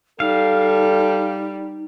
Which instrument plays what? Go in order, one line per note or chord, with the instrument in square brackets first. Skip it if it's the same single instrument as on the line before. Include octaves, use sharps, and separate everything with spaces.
[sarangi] G3 [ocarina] D#4 [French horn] A4 [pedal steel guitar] F5